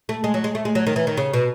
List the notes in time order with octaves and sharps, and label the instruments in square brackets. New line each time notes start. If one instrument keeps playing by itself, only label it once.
[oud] A3
G#3
F#3
G#3
A3
G#3
F#3
D#3
E3
D#3
C#3
B2